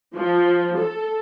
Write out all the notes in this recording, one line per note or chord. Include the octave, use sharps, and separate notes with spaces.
F3
A4